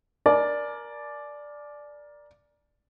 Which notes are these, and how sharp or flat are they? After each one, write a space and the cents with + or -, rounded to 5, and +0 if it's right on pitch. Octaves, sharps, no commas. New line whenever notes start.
A#4 +15 D5 +0 G#5 +45